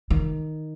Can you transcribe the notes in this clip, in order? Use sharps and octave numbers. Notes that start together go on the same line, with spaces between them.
D#3